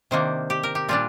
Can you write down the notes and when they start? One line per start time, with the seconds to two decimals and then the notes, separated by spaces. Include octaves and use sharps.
0.11 C3 D#3 A#3 D4 C5
0.50 G4
0.63 A#4
0.75 G4
0.89 A#2 G3 D4 F4